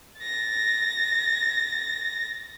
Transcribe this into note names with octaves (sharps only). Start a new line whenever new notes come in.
A6 A#6